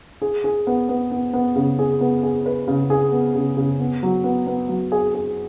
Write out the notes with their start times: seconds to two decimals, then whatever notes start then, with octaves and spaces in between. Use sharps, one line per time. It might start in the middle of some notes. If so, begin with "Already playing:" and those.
0.22 G#4
0.44 G#4
0.67 B3
0.89 B3
1.11 B3
1.33 B3
1.56 C#3
1.79 G#4
2.01 B3
2.23 G#4
2.46 B4
2.68 C#3
2.90 G#4
3.12 B3
3.35 C#3
3.57 C#3
3.80 B3
4.03 F#3
4.24 B3
4.47 B3
4.69 F#3
4.92 G#4
5.14 G#4